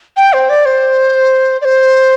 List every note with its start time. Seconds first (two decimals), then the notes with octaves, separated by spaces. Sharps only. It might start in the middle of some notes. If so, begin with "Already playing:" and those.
0.17 G5
0.33 C5
0.49 D5
0.65 C5
1.61 D5
1.65 C5